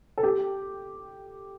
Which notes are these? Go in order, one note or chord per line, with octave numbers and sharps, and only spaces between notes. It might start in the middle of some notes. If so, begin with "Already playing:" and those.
A4
G4